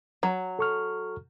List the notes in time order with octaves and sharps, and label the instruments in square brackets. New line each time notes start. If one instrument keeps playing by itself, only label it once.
[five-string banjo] F#3
[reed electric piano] A4 C#6 F6